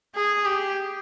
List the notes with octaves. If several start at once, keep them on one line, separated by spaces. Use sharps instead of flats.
G#4
G4